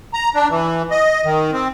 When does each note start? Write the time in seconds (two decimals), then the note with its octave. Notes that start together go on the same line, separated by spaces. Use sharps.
0.14 A#5
0.35 D4
0.50 E3
0.91 D#5
1.25 D#3
1.52 C4